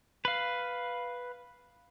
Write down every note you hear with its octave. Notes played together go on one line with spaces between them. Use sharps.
B4 F5